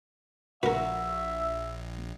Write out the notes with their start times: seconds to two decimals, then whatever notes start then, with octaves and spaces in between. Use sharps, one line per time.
0.63 A#1 F#4 A#4 B4 E5